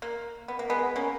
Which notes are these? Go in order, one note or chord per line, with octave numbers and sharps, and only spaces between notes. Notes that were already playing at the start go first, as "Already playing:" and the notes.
A#3
B3
A#3
G#3 B3
A#3 C#4